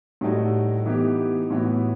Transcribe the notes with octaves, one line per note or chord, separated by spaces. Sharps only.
A2 G3 D#4 F#4 A4
E3 B3 D#4 G4
A2 E3 B3 F#4